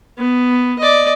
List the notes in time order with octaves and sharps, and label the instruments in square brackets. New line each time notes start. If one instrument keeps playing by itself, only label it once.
[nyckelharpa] B3
D5 D#5